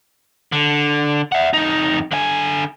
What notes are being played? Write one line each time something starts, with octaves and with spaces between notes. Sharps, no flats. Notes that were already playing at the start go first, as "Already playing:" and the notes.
D3
E5 F#5
F2 D#4
D3 G#5